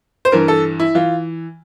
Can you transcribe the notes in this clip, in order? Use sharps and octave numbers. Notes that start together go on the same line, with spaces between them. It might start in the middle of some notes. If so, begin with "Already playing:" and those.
C5
G2 E3 A#4
A4
E4
E3 F4